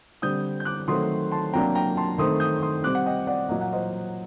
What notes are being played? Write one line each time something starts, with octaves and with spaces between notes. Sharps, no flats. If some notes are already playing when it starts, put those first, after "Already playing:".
D3 G3 C4 D#6 G6
G6
D6 F#6
D#3 F#3 A3 C4 C6 D#6
A5 C6
C3 F#3 A#3 D4 G5 A#5
G5 A#5
A5 C6
D#3 A3 C4 C6 D#6
D#6 G6
C6 D#6
C3 G3 C4 D6 F#6
F#5
D#5 G5
D5 F#5
A#2 F#3 A#3 D#5
F#5
C5 D#5